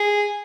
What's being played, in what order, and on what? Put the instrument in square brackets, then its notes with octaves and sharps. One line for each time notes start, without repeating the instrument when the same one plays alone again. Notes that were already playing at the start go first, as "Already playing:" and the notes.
Already playing: [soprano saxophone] G#4